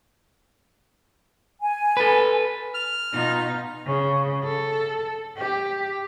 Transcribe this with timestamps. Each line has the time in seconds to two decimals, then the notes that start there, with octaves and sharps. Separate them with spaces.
1.61 G#5
1.97 A4 B4
2.74 F6
3.13 B2 D#4 F4
3.86 C#3
4.44 A4
5.37 G4